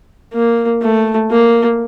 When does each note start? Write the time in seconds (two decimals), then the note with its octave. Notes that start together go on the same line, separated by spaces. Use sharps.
0.33 A#3
0.82 A3
1.30 A#3